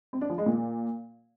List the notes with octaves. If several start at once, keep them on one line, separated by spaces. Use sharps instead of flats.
C4
D4
F3
G#3
A#2